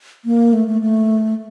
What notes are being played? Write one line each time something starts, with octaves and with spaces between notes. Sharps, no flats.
A#3
A3
A3
A3